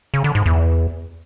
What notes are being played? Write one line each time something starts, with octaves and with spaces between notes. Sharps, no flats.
C#3
D3
G#2
E2